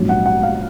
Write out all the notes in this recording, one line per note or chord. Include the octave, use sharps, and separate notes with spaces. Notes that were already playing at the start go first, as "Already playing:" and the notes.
Already playing: A#1 G#2 F#3 C#4
F#5
F#5
F5